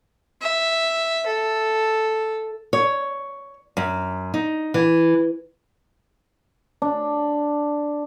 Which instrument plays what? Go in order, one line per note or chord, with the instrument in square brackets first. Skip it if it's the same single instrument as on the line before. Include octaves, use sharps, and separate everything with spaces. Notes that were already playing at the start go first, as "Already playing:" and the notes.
[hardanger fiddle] E5
A4
[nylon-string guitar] C#5
F#2
D#4
E3
[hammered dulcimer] D4